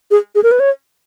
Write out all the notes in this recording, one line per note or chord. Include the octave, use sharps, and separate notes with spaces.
G#4
G#4
A#4
B4
C#5